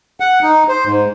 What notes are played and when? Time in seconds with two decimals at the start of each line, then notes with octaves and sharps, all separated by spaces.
0.20 F#5
0.43 D#4
0.68 C5
0.86 G#2